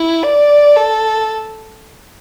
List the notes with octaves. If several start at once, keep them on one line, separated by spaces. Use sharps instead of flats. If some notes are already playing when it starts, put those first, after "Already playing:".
Already playing: E4
D5
A4